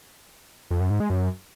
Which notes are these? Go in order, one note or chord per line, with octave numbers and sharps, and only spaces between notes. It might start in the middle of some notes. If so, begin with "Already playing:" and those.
F2
F#2
G#2
G#3
F#2